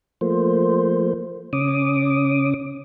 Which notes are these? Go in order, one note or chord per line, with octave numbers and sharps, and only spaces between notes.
F3 A3 A#3 C5
C#3 C#4 D6 D#6